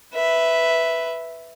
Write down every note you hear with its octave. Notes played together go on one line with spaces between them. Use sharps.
B4 E5